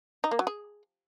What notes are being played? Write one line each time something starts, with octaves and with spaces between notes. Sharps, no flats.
D#4
A#3
F#3
G#4